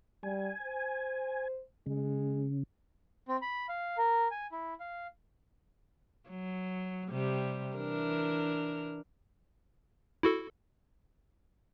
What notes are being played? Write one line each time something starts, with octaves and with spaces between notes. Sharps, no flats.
G3 G#5
C5
C#3 G#3
C4
B5
F5
A#4
G#5
E4
F5
F#3
C3 G3
E3 D4 A#4
E4 F#4 A4